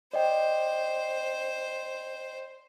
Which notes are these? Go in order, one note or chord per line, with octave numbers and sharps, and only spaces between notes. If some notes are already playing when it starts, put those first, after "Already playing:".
C5 D5 D#5 G5